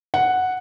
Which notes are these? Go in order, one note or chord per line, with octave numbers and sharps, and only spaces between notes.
F#5